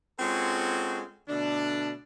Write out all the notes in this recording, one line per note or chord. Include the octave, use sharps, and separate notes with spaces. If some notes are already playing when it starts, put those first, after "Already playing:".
G#3 C4 C#4 F4 F#4 A4
B2 D3 A3 D4